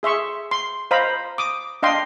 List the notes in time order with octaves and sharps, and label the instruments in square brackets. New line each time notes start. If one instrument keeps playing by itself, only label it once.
[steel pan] G#4 E5 C6 C#6
C6
C5 D#5 F5 A#5 B5
D6 D#6
D4 D#5 F5 G5 C6